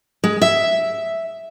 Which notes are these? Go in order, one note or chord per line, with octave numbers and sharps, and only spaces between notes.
G#3
E5